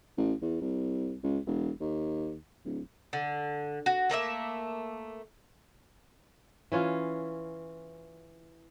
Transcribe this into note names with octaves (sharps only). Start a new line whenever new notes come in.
A1
E2
C2
C#2
E1
D#2
D1
D3
F#4
A3 A#3 D#5 E5
E3 C#4 F4